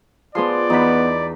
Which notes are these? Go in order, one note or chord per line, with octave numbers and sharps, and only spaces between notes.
F3 B3 G#4 D5 C6
E2 B3 D#4 B5